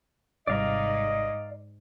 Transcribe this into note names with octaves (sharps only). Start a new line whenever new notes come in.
G#1 G#2 C3 G3 D5 D#5 F5 A#5